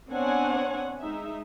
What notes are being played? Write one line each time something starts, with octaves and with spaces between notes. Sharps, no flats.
B3 C4 D4 C#5 F#5 G#5
G#3 D#4 E5